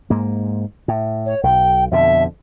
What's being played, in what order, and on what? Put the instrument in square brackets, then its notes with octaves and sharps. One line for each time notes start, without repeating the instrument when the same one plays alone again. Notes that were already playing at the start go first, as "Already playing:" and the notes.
[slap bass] G#2 A#3
A2
[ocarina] C#5
[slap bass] B1 [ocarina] G5
[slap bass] F2 B2 D3 [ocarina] E5